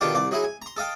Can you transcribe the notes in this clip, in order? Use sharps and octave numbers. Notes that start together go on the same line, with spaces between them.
B2 D3 D#3 D4 F4 G4
C2 D5
F#3 D#4 E4 G#4
G#5
A#5 C6
A4 D#5 F5 G5